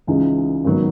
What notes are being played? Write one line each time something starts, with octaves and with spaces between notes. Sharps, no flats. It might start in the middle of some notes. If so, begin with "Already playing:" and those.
C#2 C#3 E3 G#3 D#4
G#1 D#3 F#3 B3